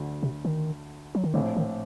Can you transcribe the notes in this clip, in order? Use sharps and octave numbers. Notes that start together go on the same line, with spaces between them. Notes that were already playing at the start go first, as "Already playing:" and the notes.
Already playing: D2 D3 F#3
C3
D#3
F#3
D#3
A#1 A2 D3 A3 C4
D#3